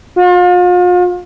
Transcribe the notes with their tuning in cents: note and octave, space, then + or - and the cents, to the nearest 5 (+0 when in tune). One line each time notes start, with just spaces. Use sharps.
F4 +40